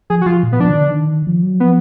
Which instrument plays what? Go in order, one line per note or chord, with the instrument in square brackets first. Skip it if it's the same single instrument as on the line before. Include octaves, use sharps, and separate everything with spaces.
[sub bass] F3 [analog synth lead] G#4
[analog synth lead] F#4
[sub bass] F3 [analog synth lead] F4
[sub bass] A#2
[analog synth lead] B3
[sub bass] F3 [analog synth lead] D4
[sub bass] D#3
D3
D#3
F3
F#3
[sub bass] F3 [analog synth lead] B3